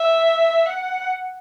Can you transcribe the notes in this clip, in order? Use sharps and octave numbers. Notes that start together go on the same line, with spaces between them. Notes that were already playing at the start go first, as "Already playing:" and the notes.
Already playing: E5
F#5